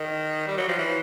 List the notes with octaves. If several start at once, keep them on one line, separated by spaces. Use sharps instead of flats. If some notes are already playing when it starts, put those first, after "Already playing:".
Already playing: D#3
G3
F#3
F3
E3